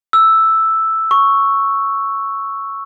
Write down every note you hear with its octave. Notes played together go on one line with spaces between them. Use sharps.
E6
C#6